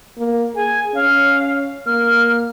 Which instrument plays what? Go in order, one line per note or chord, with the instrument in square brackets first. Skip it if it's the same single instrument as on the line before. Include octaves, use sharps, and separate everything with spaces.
[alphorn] A#3
[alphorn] G#4 [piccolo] G#5
[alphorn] C#4 [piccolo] F5
[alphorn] A#3 [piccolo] F6